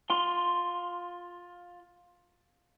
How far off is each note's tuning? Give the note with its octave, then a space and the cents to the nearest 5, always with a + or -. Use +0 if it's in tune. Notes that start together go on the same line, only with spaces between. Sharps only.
F4 +15 C6 +0